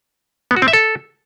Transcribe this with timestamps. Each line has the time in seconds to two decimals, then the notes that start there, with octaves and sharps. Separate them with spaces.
0.51 B3
0.57 F#4
0.62 C4
0.68 E5
0.73 A4